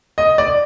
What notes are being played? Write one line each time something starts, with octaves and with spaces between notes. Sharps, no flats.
D#5
D5